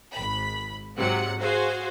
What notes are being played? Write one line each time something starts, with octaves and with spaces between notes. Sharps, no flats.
G#1 B5
G#2 C3 F#3 F#5
F#4 G#4 C5 F5